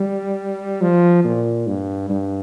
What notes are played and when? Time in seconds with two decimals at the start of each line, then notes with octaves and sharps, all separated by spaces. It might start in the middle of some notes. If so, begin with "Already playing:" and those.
Already playing: G3
0.81 F3
1.24 A#2
1.67 G2
2.10 G2